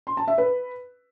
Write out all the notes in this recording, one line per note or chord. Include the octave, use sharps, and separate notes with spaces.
C6
A5
E5
B4